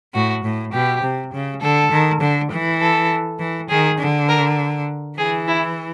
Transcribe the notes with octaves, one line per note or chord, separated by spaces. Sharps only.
A2 F#4
A2
B2 G4
C3
C#3
D3 A4
D#3
D3
E3
A4
E3
D#3 G#4
D3
A#4
E3 G#4
E4